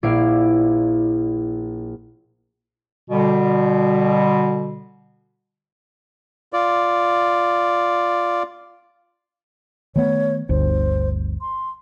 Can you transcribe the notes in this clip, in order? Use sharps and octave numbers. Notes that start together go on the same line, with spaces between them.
A#1 E4 D5 F5 C7 D7
B2 D3 G3
F4 D5
D#3 A3 B3 C#5
G1 D2 C5
C6